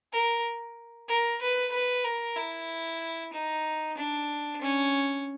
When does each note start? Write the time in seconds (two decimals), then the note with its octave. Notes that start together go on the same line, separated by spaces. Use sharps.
0.12 A#4
1.08 A#4
1.41 B4
1.72 B4
2.04 A#4
2.36 E4
3.33 D#4
3.97 D4
4.61 C#4